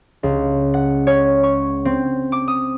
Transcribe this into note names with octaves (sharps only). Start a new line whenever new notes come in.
C#2
F#5
C#5
C#6
C4
D6
D#6